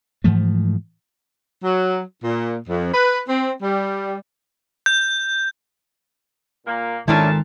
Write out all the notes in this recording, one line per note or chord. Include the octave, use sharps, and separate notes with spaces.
G#2 E3 F3 A3
F#3
A#2
F2
B4
C4
G3
G6
A#2 A#3
A#2 D#3 G#3 C#4 D4 E4 A4 A5